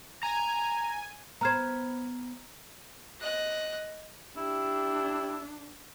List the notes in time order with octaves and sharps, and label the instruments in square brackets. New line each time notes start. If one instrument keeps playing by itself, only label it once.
[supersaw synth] G#5 [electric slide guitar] A#5
[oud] B3 C5 [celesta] A#5 F6 G#6
[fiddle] D#5 F#6
[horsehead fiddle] D4 [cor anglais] E4 [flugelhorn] G4